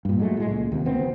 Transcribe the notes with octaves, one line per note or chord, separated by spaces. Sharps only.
G2 A#2
F#3 G#3 A3
A2 G#3
C#2 A#2
D#2 C3
F1 D2 B3 C4